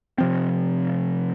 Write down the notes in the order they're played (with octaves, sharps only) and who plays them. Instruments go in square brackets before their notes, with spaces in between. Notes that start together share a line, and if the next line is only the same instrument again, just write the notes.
[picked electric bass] C3 F3 C4